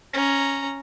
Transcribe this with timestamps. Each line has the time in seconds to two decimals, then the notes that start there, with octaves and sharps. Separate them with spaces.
0.14 C#4 A#5